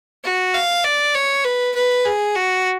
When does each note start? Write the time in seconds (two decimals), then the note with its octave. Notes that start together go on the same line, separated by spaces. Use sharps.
0.24 F#4
0.54 F5
0.84 D5
1.15 C#5
1.45 B4
1.75 B4
2.05 G#4
2.36 F#4